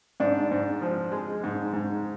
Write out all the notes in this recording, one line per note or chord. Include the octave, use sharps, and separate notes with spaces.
G#2 D4
G#2
F3
G#3
G#2
G#2